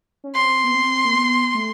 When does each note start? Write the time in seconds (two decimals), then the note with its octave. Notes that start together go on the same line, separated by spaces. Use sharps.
0.24 C#4
0.34 C4 C6
0.64 B3
0.75 C4
1.05 A#3
1.15 B3
1.54 A3